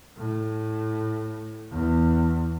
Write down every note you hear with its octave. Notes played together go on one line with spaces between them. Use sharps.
A2
E2